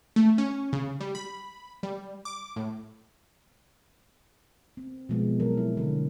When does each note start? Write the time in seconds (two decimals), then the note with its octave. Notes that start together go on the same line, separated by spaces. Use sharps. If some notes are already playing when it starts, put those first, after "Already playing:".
0.16 A3
0.38 C#4
0.73 C#3
1.01 G3
1.15 B5
1.83 G3
2.25 D6
2.56 A2
4.77 C4
5.09 B2 F3 G#3 B3
5.40 F#3 A4 A#4
5.57 E4
5.77 D3